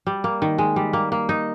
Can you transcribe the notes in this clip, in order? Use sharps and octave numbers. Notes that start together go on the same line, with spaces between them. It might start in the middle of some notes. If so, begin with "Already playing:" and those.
G3
A#3
D#3
G#3
G3
A#3
A#3
D#4